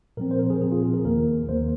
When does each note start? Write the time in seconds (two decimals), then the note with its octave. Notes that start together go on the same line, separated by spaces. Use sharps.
0.17 A#2 F3 C4 A#4
0.31 C5
0.39 A#4
0.50 G#4
0.61 A#2 F3 C4 G#4
0.72 F4
0.82 G#4
0.94 A#4
1.05 D#2 D#3 A#3 A#4
1.48 D#2 D#3 A#3 C5